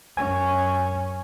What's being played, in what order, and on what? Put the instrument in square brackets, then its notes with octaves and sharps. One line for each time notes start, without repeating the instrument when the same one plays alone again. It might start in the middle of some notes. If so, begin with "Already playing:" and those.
[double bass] F#2 C#4 [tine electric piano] G#5